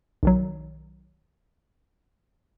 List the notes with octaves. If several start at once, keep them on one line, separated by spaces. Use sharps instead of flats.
B1 D#3 F#3